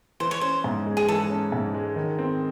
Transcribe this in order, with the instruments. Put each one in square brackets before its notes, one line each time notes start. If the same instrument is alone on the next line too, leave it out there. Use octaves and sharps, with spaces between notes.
[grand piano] E3 [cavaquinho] C5
[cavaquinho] C#5
[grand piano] C#4 [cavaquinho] C5
[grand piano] G#2
G#3
[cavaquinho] G#4
[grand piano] E3 [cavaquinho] A4
[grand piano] C#4
G#2
G#3
D#3
C4